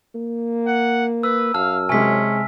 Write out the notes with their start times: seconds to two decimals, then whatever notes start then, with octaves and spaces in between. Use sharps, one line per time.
0.15 A#3
0.67 F#5
1.23 B4 E6
1.54 F#2 F5 A5 E6 F6
1.89 C3 G#3 C#4 G#5 B6